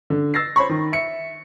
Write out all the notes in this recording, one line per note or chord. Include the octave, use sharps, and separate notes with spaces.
D3
E6 A6 A#6 C7
C5 C#5 B5 C#6
D#3
E5 C#7